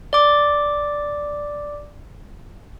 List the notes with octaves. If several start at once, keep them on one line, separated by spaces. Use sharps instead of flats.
D5 D6